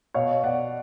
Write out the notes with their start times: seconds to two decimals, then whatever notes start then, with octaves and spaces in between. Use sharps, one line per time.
0.14 B2 C#5 F5
0.43 B2 D5 F#5